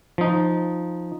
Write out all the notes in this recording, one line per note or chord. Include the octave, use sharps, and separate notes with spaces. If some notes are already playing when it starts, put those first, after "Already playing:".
F3 D#4